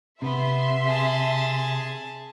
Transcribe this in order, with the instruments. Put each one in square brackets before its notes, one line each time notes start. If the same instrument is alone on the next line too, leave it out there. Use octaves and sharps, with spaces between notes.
[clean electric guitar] C3 [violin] B3 [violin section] E5 C6
[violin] G#4 A5